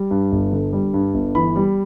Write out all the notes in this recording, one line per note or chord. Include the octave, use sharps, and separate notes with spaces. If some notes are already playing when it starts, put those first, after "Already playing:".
Already playing: G3
G2
G1
D3
G3
G2
G1
E3 B5
G3